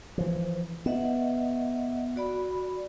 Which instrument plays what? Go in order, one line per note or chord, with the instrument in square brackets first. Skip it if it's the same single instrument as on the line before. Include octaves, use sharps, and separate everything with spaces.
[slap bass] E3 F3
[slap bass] B3 [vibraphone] D#5 E5 F#5
[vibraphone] F#4 D5 B5